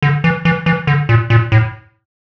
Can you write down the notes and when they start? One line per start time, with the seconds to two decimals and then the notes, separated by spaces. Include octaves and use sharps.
0.02 D3
0.24 E3
0.45 E3
0.66 E3
0.87 D3
1.09 A#2
1.30 A#2
1.52 A2